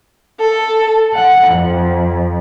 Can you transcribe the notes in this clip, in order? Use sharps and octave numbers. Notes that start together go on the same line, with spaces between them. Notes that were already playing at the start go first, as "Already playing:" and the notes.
A4
F#5
F2